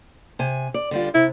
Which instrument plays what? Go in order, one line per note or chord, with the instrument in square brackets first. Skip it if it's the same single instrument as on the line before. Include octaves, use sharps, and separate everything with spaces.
[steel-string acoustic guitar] C3 G#5
D5
D3 G3 F4
[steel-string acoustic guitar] C3 [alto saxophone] E4